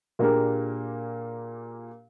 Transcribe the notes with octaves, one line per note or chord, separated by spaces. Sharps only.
A#2 A#3 D4 G4 G#4 A#4